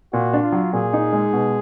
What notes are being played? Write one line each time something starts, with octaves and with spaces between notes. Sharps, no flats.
A#2 F#4
D4
F4
F#3
A#2 G#4
D#4
G#3
B2